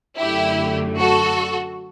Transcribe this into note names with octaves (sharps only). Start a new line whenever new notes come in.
F#2 D3 A3 E4 G4
F#4 A4